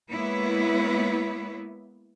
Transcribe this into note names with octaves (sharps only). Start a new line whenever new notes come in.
G#3 A#3 B3 E4 B4 C#5